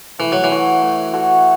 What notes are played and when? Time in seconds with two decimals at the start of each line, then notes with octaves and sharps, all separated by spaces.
0.19 E3 A3
0.32 F#3
0.44 E3
0.51 F#4 A4 C#5
0.82 A3
1.13 F#4 A4 C#5